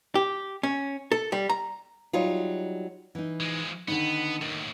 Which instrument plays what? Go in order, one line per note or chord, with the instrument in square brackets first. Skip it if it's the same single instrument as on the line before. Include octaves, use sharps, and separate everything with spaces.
[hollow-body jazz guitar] G4
C#4
A4
G3
A#5
[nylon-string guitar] F#3 G3 D#4 F4
E3 D#4
[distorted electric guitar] F3 G#3
[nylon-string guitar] D3 D#3 D#4 [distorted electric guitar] B3
[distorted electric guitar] D#2 A2 [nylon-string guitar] D#3